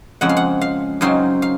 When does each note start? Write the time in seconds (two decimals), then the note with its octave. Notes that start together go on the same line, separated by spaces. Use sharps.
0.21 F2 C#3 G#3 C4 F#5
0.29 F5
0.37 F#5
0.61 F5
1.01 F#2 C#3 F#3 C4 D#4 F5
1.42 F5